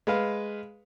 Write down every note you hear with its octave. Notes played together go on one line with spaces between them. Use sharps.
G#3 B4 F5